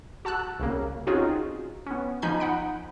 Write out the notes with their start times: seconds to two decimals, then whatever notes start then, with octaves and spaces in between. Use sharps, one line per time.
0.25 F#4 A5 E6 F#6
0.59 C2 C#3 A#3
1.07 C4 C#4 D#4 F4 F#4 G#4
1.86 B3 C#4
2.22 F3 D#4 G#5 B5 G6
2.40 D#4 F#5 B5 D7